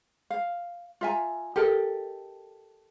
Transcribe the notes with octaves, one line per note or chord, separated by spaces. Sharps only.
F5
F4 E5 G#5 A#5
G4 A4 A#4 D#5